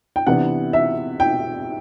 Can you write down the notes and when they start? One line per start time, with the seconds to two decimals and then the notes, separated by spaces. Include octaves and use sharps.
0.16 G5
0.27 C3 E3 B3 D4 F#5
0.73 E5
1.20 G5